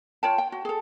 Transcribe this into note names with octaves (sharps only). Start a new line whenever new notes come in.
F4 C#5 G5 A5
G5
F#4
G#4 A4